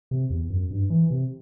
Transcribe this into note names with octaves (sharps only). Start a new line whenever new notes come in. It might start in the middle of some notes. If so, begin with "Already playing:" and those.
C3
E2
F#2
G2
E3
C3